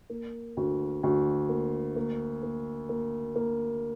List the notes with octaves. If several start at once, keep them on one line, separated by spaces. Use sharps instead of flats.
A#3
D2
D2
A#3
A#3
A#3
A#3
A#3